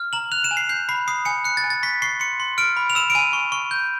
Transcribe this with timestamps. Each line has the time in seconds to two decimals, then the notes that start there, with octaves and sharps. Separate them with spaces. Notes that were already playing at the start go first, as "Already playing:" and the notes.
Already playing: F6
0.13 A#5 F#7
0.32 F#6 F7
0.44 E7
0.51 G#5
0.57 C7
0.69 G6 C7
0.89 B5 C7
1.08 D#6 C7
1.25 G#5 C#7
1.44 F#6 C#7
1.57 A6
1.64 G#5
1.70 A6
1.83 C#6 B6
2.02 C#6 C7
2.20 C6 C#7
2.40 C6
2.58 F6 D7
2.77 B5
2.90 F7
2.95 E6 E7
3.10 D7
3.15 G#5 D#7
3.33 C#6
3.52 C#6
3.71 G6